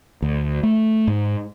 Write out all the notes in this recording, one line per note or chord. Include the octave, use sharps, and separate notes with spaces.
D2
A3
G#2